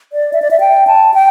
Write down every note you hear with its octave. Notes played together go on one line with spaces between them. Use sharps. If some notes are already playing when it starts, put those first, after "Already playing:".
D5
E5
D5
E5
G5
A5
G5